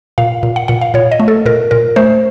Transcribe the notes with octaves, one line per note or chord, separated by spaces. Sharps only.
A#2 F5
A#2
F#5
A#2 F#5
F5
A#2 C#5
D#5
A3
A4
A#2 A#4
A#2 A#4
A3 C5